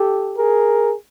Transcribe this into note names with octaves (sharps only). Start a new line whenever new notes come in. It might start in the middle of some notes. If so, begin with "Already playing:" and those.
Already playing: G4 A4
G#4 A#4